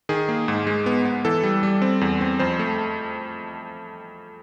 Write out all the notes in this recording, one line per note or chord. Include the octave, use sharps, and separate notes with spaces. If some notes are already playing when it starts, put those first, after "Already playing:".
D#3 G#4
A#3
G#2
G#3
B3
B3
E3 A4
G3
G3
C4
E2
C4
F2 C5
A3